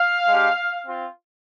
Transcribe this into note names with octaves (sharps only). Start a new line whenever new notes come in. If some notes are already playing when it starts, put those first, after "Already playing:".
Already playing: F5
G#3 D4 G4
C4 F4